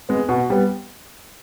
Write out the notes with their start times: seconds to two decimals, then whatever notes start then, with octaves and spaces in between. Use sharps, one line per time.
0.09 G#3 B3
0.29 B2
0.50 G3 B3